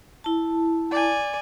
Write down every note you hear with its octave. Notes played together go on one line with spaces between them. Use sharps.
E4 A5
D5 G#5